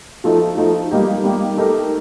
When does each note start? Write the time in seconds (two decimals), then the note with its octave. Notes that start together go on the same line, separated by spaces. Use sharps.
0.24 F3 A3 D#4
0.57 F3 A3 D#4
0.91 G3 A#3 D#4 G4
1.24 G3 A#3 D#4 G4
1.57 A3 D#4 G4 A#4